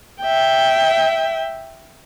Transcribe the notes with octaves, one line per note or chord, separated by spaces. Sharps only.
E5 G5